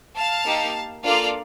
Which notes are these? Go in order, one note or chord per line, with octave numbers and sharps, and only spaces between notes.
F5 A5
A#3 D#4 G4
A#3 D4 F4 A4 D5 F5